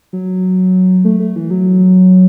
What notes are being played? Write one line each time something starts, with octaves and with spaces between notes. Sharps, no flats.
F#3
A3
A3
E3
F#3